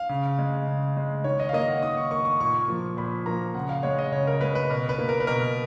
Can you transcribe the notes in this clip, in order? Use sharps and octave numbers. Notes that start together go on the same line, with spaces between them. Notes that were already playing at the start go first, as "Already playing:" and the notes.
Already playing: F5
C#3
G#3
C#3
G#3
D#3 C#5
D#5
F5
A#3 D#5
F#5
D#3 D#6
C#6
A#3 C#6
C#6
A#2 C#6
F3 A#3
A#2 B5
F3 A#3 A#5
C#3 F#5
F5
G#3 C#5
D#5
C#3 C#5
A#4
G#3 B4
B4
B2 A#4
B4
A#3
A#4
B4
B2 A#4